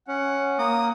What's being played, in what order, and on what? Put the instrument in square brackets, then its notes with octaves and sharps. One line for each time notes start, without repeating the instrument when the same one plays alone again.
[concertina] C#4 [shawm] F#5
[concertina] A#3 [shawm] D#6